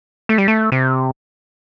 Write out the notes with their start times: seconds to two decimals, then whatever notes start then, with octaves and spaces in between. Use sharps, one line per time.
0.29 A3
0.38 G3
0.48 A3
0.72 C3